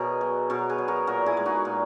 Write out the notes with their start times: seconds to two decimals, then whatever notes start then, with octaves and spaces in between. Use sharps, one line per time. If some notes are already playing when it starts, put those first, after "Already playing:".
Already playing: B2 F#4 G#4 A#4 C#5 D#5
0.21 F#3
0.50 B2 F#4 A#4
0.69 G#4 B4
0.78 F#3
0.88 F#4 A#4
1.07 A#2 F#4 A#4
1.26 E4 G#4
1.37 G#3
1.46 D#4 F#4
1.65 A#2